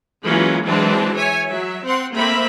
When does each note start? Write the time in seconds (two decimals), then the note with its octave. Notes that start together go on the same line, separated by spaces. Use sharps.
0.24 E3 F#3 G#3 A#3 C#4 F4
0.65 E3 F#3 G#3 C4 D4 A5
1.14 C#5 E5 G#5
1.47 F#3 E5
1.85 C4 F#5 C6
2.15 A3 A#3 C4 E5 B5